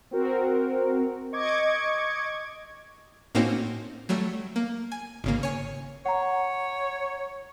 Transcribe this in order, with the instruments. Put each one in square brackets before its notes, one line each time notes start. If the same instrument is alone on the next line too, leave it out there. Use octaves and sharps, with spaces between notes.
[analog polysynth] C4 F#4 A#4
D#5 C#6 D6 G#6
[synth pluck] A2 A#3 C4 C#4 D#4 F#4
F#3 G3 A3
A#3
G#5
G#1 C#3 A#3
C#5 G#5
[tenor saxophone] C#5 [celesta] F#5 A#5